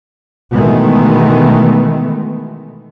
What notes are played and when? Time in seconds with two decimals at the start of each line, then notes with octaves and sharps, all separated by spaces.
0.52 B2 D#3 E3 G#3 A3 B3